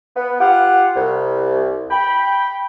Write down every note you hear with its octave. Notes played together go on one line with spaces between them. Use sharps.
B3
F4 G4 F5 F#5
C2
G5 B5